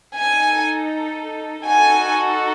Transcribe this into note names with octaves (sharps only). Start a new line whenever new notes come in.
D#4 A4 G#5
D#4 F#4 A4 G#5